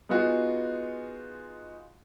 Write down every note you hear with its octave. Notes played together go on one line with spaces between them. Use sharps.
G#3 B3 D#4 F4 F#4 G#4